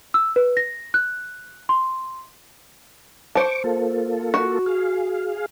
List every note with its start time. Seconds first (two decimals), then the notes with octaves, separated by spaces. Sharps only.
0.14 E6
0.36 B4
0.57 A#6
0.94 F#6
1.69 C6
3.35 C5 A5 C#6 D6
3.64 A#3 F4 A4
4.34 F#4
4.66 G#4 F5